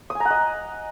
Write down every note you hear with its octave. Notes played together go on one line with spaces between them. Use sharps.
D#6
G#5
A#5
F#5
D#5